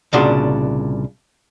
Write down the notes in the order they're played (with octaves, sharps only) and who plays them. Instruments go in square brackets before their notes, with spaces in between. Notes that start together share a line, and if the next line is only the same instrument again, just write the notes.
[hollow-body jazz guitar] C2 A#2 C#3 D4 F#4 C6